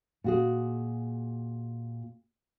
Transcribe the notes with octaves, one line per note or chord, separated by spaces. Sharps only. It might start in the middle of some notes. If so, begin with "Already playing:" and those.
A#2 F#4 G#4